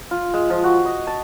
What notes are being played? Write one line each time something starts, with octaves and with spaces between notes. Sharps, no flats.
F4
G#3
F3
F#4
D#5
A5